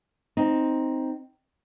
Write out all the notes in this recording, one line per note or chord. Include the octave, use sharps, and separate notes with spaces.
C4 D#4